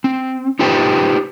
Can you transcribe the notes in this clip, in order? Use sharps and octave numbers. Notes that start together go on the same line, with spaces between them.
C4
D#4 F4 G4 B4 C5 G5